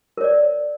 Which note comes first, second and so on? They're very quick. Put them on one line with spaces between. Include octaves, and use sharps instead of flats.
A#4 C#5 D5